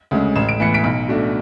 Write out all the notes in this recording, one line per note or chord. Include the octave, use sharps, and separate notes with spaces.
D2 C#3 G#3
A1 E7
D7
A2 E3 B3 C#7
B6 D7
B1
B2 A3 D4